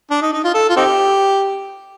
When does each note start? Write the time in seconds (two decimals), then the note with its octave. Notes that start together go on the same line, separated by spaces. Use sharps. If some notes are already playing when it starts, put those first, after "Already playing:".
0.11 D4
0.22 D#4
0.33 D#4
0.44 F4
0.54 A4
0.70 F4
0.76 C4 D#4 G4